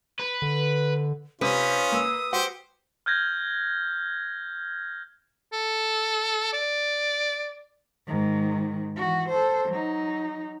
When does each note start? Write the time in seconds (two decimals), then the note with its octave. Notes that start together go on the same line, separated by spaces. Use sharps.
0.20 B4
0.42 D3
1.41 C3 C#4 F4 B4 D#6
1.92 A#3 E6
2.33 F#4 G4 C5
3.06 F6 G6 G#6 A#6
5.53 A4
6.53 D5
8.07 G#2 D#3
8.96 E3 F#4
9.29 A4 C5
9.69 F#3 D#4